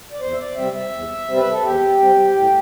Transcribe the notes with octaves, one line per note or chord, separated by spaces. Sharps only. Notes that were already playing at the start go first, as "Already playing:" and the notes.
D5
E2 C5
E5
D5
C3 G3 C4 E5
E5
E2
C3 G3 C4
B4
A4
E2 G4
C3 G3 C4
A2